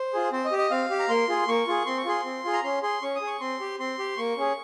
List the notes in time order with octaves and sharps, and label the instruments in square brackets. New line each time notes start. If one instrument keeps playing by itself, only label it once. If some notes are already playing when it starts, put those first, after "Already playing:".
Already playing: [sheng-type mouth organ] C5
F4 G#4
C4 C5
D#5
G4
D#5
C4 F5
G4
A#5
A#3 C6
F4 G#4
A#3 C#6
F4 G#4
C4 C6
C#6
F4 G#4 C6
C4
F4 G#4
A#5
C#4 C6
G#4 C6
C#4 C#6
D#6
G#4
C#6
C4 C6
G4
C4 C6
G4
A#3 C#6
C#4 G#4